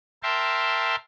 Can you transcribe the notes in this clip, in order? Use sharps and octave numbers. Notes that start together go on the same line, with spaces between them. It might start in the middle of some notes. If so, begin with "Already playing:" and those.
A#4 E5 G5 A5 C6